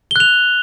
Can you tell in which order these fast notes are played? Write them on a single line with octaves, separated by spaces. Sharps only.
G7 F#6 F7